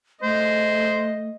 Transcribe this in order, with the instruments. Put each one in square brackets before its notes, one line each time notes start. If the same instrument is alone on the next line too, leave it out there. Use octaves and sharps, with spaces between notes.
[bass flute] A3 [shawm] C5 [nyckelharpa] D#5